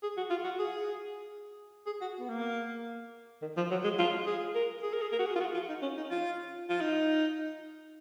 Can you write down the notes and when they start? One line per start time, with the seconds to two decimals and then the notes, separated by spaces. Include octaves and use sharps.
0.03 G#4
0.17 F#4
0.30 F4
0.44 F#4
0.59 G#4
1.86 G#4
2.01 F#4
2.20 B3
2.29 A#3
3.42 D#3
3.57 F3
3.71 F#3
3.84 G#3
3.99 F4
4.26 G#4
4.55 A#4
4.83 G#4
4.93 A#4
5.02 G#4
5.12 A#4
5.19 F#4
5.26 G#4
5.36 F4
5.40 F#4
5.54 F4
5.69 D#4
5.82 C#4
5.97 D#4
6.10 F4
6.70 F4
6.81 D#4